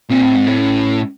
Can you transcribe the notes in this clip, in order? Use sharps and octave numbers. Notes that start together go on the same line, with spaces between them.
A#2 C4
A2
G#2
A2
C#4